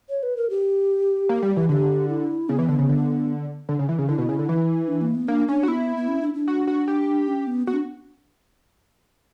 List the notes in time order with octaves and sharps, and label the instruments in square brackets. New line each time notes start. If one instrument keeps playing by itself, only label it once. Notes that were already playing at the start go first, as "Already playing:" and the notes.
[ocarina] C#5
B4
A#4
G4
[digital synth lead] A#3
G3
E3
[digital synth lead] D3 [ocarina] G4
[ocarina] E4
[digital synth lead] C#3 [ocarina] B3
[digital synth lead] E3
D3
C#3
D3
D3
C#3
E3
C#3
[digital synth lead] D3 [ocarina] E4
[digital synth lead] B2
C#3
D3
E3
[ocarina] D4
A#3
B3
[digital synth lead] A#3 [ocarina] D4
[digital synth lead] C#4 [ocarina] D4
[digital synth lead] F#4
[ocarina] B3 [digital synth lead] E4
[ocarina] B3
C#4
D4
D4
[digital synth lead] F#4
F#4
G4
[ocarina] C#4
B3
[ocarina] B3 [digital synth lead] F#4
[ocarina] D4